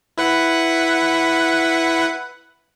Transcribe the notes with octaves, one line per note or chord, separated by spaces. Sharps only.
E4 B4 F#5